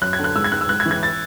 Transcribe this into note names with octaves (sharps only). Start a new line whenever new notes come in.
F#2 F#6
G#6
D3
F#6
G#2 E6
G#6
G#2 F#6
E6
G#2 F#6
G#6
E3
G#6
A6